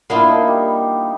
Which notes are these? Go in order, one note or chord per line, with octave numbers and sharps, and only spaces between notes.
A#3 B3 D4 E4 F4
D#4
G3